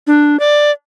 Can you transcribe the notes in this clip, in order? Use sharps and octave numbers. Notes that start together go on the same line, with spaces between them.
D4
D5